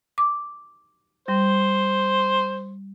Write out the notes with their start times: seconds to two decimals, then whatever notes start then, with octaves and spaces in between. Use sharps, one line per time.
0.18 D6
1.28 G3 C5